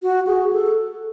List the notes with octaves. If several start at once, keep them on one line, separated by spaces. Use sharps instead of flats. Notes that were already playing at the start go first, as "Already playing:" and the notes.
F#4
G#4
A4